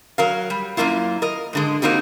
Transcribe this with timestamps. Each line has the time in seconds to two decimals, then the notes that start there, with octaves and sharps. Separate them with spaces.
0.18 F#3 A#4 F5
0.50 G3
0.77 F#2 C3 A#3 E4 F4
1.22 A#4 D#5
1.53 G#2 D3 G#3
1.82 A#3 C4 D#4 F#4 G4